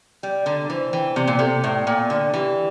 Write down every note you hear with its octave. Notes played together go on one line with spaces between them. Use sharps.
G3 G5
D3 A#5
E3 C5
E3 G5
C3 D5
A#2
C3 A4
A2 D5
A#2 G5
D3 D5
E3 G4